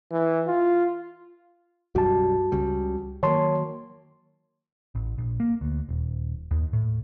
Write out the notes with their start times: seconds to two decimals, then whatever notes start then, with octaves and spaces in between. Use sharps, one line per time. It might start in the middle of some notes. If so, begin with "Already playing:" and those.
0.12 E3
0.47 F4
1.95 B1 F#2 G3 F#4 A5
2.52 C#2 C#3 G3
3.23 D#3 F#3 A#3 C#5 A5 C6
4.95 A1
5.18 A#1
5.40 A#3
5.61 D2
5.89 D#1
6.51 D#2
6.73 A2